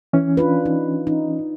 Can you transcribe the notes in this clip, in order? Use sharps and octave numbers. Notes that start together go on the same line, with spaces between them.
E3 C#4
D4 F4 B4
D#4
D#4